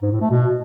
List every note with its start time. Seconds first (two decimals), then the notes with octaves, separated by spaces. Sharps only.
0.02 G#2
0.12 A2
0.21 A3
0.31 B2